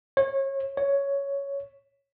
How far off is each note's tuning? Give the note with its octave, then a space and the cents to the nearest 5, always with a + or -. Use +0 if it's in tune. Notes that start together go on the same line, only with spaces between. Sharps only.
C#5 -30
C#5 +5